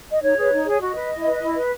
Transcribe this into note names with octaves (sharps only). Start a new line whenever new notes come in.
D#5
D#4 C#5
G#4 B4
D#4
G#4 C#5
F#4 D#5
B4
E4
B4
E4
B4